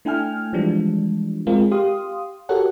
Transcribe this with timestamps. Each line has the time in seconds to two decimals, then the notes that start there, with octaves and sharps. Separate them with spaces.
0.05 A3 D4 E4 G5 G#5 F6
0.53 E3 F3 G3 G#3 D4
1.47 G#3 C4 F4 G#4 A#4
1.71 G4 F5 C6 D#6
2.49 F#4 G4 A4 A#4 C#5 F#5